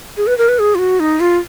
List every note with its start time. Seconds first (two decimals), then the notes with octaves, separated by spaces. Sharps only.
0.17 G#4
0.27 B4
0.38 A#4
0.49 B4
0.59 G#4
0.75 F4
0.79 F#4
1.00 D#4
1.20 F4